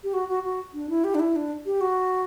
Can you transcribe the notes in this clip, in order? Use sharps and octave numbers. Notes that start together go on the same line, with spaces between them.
G4
F#4
F#4
F#4
D4
E4
G4
D4
E4
D4
G4
F#4